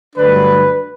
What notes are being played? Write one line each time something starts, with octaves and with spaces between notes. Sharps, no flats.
G2 D3 F#3 A3 D4 B4